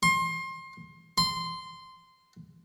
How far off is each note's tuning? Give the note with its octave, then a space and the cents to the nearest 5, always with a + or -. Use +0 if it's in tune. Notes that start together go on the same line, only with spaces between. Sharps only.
C6 +30
C6 -10